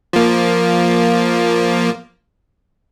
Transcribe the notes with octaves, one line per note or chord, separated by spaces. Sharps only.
F3 A#3